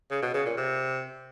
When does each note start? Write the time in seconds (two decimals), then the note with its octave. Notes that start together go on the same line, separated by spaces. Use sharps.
0.11 C#3
0.23 B2
0.34 C#3
0.46 A#2
0.57 C3